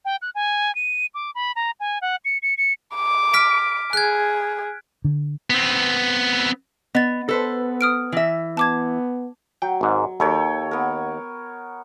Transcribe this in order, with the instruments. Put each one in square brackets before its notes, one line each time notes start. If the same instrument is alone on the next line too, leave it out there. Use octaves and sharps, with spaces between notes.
[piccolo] G5
F#6
G#5
D#7
D6
B5
A#5
G#5
F#5
C#7
C#7
C#7
[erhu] D6
[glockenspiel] F6 B6 D7
[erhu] G#4 [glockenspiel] F#6 G#6
[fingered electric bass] D3
[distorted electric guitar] B3 C4
[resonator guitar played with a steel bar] B3 [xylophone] D#5 A6
[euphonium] B3 [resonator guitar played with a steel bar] A4 B4 C5
[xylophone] D#6 F6 D7
[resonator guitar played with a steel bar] E3 E5
[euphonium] B3 [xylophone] A5 D6 G#6
[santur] F#3 [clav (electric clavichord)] G5
[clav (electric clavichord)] G#1 G#2
[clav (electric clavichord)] D#2 [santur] A4 C#5 G5
[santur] B3 A#4